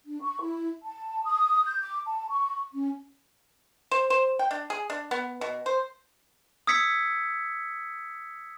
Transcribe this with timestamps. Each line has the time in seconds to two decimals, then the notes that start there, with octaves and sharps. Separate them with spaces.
0.05 D4
0.22 C#6
0.41 E4
0.84 A5
1.25 D#6
1.65 G6
1.80 D6
2.06 A5
2.29 C#6
2.73 C#4
3.91 C5
4.10 C5
4.39 G5
4.51 D4
4.70 G#4
4.90 D4
5.11 B3
5.41 B2
5.66 C5
6.67 D#6 E6 G#6 B6 C#7